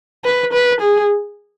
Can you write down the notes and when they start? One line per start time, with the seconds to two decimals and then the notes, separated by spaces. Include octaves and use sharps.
0.25 B4
0.53 B4
0.81 G#4